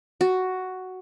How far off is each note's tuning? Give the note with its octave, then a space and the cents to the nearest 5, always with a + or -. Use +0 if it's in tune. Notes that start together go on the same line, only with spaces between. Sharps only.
F#4 +5